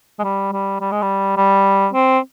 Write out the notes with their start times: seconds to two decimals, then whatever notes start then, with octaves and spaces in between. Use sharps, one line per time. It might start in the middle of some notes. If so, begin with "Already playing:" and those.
0.19 G#3
0.24 G3
0.52 G3
0.80 G3
0.92 G#3
1.02 G3
1.37 G3
1.93 C4